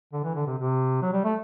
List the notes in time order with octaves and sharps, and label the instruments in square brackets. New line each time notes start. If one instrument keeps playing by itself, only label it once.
[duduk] D3
E3
D3
C3
C3
F#3
G3
A3